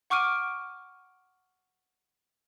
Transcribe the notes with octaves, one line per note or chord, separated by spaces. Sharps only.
F#5 C#6 D6 F6 D7 D#7